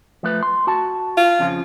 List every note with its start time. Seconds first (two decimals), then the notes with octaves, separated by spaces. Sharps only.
0.23 F3 A3 B4
0.43 C6
0.67 F#4 A5
1.17 F4
1.39 F2 C#3 F3